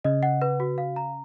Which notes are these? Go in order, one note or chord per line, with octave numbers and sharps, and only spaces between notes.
C#3 D#5
F#5
B4
F#4
F5
A#5